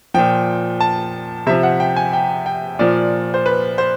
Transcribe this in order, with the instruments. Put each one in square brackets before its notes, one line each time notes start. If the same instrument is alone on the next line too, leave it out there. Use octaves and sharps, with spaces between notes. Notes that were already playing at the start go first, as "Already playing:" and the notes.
[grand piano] A#2 F3 G5
A5
C3 F3 E5
F#5
G5
G#5
G5
G5
A#2 F3 D5
C5
B4
C5